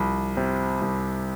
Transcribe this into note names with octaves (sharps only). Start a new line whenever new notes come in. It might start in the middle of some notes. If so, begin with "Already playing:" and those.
Already playing: C2 F3
C3
C2